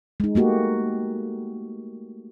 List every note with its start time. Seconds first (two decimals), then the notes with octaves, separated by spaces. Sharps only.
0.20 G#3 D#4
0.35 A3 A#3 F#4 G4